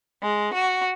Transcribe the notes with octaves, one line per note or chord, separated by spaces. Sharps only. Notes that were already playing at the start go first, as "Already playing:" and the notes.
G#3
F#4